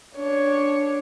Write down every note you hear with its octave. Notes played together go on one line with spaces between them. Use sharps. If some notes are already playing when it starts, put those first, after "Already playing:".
D4 C#5